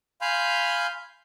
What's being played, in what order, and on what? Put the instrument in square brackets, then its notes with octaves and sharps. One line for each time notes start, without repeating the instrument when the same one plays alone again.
[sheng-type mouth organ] F5 G#5 B5 C6 F6 G6